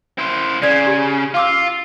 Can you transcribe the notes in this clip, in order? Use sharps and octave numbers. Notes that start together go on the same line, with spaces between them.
E4 C5
C#3 D5 G#6
G4
F4 F5 D6 E6